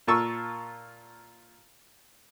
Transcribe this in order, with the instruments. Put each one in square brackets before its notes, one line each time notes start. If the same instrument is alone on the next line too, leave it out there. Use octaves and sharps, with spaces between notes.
[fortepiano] A#2 F4 A#4 A5 C#6 E6